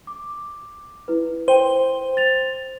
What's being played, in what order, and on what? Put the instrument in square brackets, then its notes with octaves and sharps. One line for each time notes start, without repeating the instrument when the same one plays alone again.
[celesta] D6
E4 B4
[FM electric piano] C5 [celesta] G5 D#7
[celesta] A6 F7